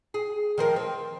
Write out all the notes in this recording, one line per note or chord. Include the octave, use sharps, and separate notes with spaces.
G#4
D#3 F3 A#4
C4